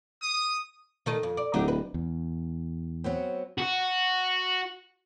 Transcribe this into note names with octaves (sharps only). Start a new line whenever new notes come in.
D#6
D#3 A3 D#5
F2
D5
D1 F#3 D#4 G4
B4
E2
F#3 B3 C4
F#4